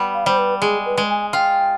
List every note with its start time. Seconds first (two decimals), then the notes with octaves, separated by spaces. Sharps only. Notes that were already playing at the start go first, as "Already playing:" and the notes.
Already playing: G3 B3
0.14 F5
0.26 G3 C5
0.38 B4
0.61 G#3 G#4
0.85 B4
0.97 G#3
1.09 G#5
1.33 F4 G5